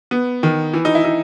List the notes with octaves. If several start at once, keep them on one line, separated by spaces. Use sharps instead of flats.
B3
D#3
E3
D#4
E4
D#4